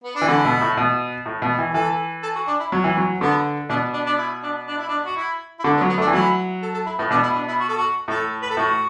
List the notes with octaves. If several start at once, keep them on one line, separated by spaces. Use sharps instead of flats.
B3
D4
E3
D3 E4
B2
A2
B2
A2
B2
E3
E3 A4
A4
F#4
D4
E4
F#3
E3
F#3
D3 B3
B2 D4
D4
D4
E4
D4
D4
E4
D4
F#4
E4
E4
D3 D4
B3
F#3
B3
A3 D4
E3
F#3 E4
A4
A4
E4
A2 B3
B2 D4
E4
D4
E4
F#4
A4
F#4
A2 A4
B4
A4
A2 F#4